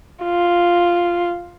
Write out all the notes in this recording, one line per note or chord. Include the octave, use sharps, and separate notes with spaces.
F4